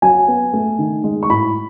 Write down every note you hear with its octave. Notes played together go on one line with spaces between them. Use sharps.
F#3 G#5
B3
A3
D#3
G#3
C#6
A2 B5